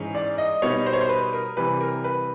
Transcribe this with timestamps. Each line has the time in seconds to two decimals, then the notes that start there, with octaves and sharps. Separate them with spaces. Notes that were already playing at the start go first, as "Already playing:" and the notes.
Already playing: G#2 E3 G#3 C#4
0.15 D5
0.38 D#5
0.62 B2 G3 B3 D#4 C#5
0.86 C5
0.93 C#5
1.01 C5
1.09 B4
1.33 A#4
1.57 C3 E3 G3 B4
1.81 A#4
2.04 B4